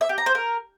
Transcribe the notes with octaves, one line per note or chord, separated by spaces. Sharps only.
E5
G4
A#5
C5
A#4